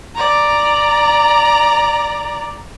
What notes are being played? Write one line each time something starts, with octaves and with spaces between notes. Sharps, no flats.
D5 A#5